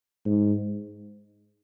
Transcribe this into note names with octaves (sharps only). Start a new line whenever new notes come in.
G#2